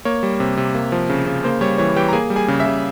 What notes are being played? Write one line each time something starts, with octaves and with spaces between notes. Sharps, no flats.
A#3 C#5
G3
C3
C3
A#3
F3
C#3
C#3
A#3 C5
G3 C#5
E3 C#5
E3 G4 G5
A#5
A#3 G#4 G#5
G3
G#4 G#5
C#3
E5 E6
C#3